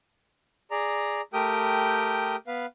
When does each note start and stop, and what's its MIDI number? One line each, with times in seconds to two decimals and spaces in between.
0.71 1.21 68
0.71 1.21 74
0.71 1.21 82
1.33 2.36 57
1.33 2.36 67
1.33 2.36 70
1.33 2.36 79
1.33 2.36 87
1.33 2.36 91
2.47 2.66 59
2.47 2.66 71
2.47 2.66 77